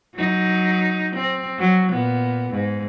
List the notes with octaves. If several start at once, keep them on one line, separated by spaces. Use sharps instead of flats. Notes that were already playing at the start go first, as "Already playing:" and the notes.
F#3 D#4
C4
F#3
A#2 B3
G#2